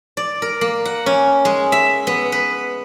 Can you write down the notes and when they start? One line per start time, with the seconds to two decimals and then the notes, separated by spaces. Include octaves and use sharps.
0.17 D5
0.42 A#4
0.61 A#3
0.85 F#5
1.06 C#4
1.45 G#3
1.72 E5
2.07 B3
2.32 B4